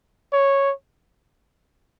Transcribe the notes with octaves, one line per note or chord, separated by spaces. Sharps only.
C#5